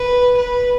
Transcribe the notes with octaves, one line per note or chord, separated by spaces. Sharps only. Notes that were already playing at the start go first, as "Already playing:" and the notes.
Already playing: B4
B4